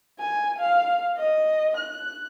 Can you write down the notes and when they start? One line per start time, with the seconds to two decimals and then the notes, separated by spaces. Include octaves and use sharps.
0.19 G#5
0.59 F5
1.18 D#5
1.77 F#6